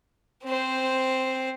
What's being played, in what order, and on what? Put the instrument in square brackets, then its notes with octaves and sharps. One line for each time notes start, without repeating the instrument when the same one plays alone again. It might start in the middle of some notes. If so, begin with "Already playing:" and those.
[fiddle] C4 C5